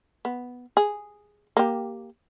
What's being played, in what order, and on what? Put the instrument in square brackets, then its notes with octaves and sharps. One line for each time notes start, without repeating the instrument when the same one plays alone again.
[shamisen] B3
G#4
A#3 G4